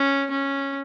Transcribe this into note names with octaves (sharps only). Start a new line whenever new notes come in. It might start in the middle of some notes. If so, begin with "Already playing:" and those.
Already playing: C#4
C#4